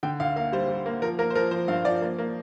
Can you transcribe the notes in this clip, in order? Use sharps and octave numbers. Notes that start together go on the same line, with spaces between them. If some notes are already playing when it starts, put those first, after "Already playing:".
D3 G5
D2 F5
A#3 F5
G3 C5
G3
A#3
F3 A#4
A#3 A#4
C5
F3 A#4
F3 C5
G2 F5
F3 D5
A#3
A#3